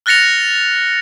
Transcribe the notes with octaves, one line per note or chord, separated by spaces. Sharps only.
F6 F#6 A6 A#6 C#7 F7